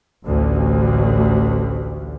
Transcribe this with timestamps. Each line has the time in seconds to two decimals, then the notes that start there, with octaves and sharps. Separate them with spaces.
0.23 A1 D2